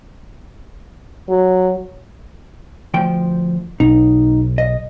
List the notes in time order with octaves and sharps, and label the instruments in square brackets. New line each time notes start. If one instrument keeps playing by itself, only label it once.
[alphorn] F#3
[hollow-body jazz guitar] D2 F3 G5
[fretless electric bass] B1 [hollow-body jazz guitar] D#4
[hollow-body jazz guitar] D#5